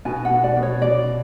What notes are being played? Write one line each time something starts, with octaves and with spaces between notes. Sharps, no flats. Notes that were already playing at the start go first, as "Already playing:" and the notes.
B2 G#5
F#5
B2
D5
B2
C#5
B2 D5